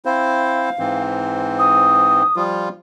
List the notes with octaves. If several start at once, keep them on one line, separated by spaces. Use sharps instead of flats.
C4 E4 C5 F5
G#2 E3 C4
D#6
F3 G3 F4